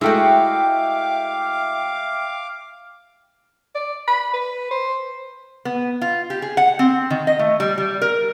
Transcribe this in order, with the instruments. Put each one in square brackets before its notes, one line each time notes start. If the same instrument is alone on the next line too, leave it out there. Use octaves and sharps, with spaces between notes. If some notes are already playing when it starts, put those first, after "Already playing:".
[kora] G#3 A3 F#4 [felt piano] E4 [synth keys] E5 G5 [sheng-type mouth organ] F5 D6
[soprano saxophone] D5
B5
B4
C5
[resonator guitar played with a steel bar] B3
F4
G4
G#4
F#5
C4
D#3
D#5
A3
G3
G3
A#4